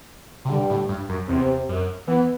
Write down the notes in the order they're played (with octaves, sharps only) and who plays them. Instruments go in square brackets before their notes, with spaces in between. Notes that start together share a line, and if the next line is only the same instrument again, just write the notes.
[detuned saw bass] C3
[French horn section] G2 G3 [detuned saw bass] D3
[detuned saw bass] A2
G2
F#2
[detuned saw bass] E2 [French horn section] C3 C4
[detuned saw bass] F#2
[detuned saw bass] E3 [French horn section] B3